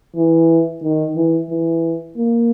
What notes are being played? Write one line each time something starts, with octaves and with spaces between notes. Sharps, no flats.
E3
D#3
E3
E3
A#3